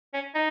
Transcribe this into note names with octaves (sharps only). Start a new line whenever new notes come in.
C#4
D#4